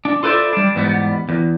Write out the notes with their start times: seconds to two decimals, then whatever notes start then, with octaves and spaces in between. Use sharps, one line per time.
0.05 D4
0.23 F4 A4 B4 C5 D5 E5
0.53 G3 D4
0.75 E2 G#2 G3 B3
1.29 E2